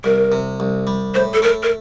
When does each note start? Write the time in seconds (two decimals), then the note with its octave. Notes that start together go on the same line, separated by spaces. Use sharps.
0.04 C2 A#4
0.32 C3
0.60 C2
0.87 G3
1.14 A2 C5
1.34 A4
1.42 A3 A#4
1.63 A#4